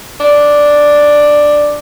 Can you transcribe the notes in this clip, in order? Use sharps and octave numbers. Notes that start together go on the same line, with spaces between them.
D4